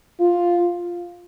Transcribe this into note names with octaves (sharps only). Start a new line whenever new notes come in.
F4